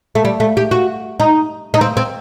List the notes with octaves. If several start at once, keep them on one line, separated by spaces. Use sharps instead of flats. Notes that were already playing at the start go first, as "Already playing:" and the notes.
A3
G3
A3
G4
F#4
D#4
D#4
C4
C4